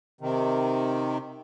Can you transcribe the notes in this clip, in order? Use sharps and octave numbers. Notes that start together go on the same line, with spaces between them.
C3 D#3